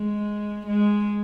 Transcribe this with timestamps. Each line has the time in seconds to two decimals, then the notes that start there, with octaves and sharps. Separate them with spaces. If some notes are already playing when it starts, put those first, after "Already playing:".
Already playing: G#3
0.66 G#3